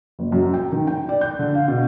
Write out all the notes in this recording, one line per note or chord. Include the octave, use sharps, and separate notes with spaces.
F#1
F#2
G5
D#3
G5
D5
G6
D3
F5
B2